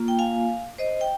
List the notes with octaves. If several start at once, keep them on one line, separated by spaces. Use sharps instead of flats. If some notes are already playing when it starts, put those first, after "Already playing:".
Already playing: A#3 F4
G5
F5 G#5
C5 D#5
G5